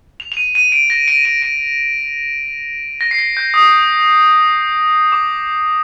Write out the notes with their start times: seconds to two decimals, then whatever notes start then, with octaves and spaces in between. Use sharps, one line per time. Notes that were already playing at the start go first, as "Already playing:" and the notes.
0.20 F7
0.32 F7
0.37 D#7
0.55 D#7
0.72 D7
0.90 A#6
1.08 D7
1.25 D#7
1.42 D7
3.01 A#6
3.11 C7
3.19 A#6
3.37 G6
3.54 D#6
5.12 D6